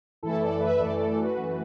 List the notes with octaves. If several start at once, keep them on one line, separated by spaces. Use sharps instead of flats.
F#2 E3 A3 E4 A4
A4 D5
B4 E5
F#2 E3 A3 A4 D5
A4 D5
D5
F#4 B4
F#2 E3 A3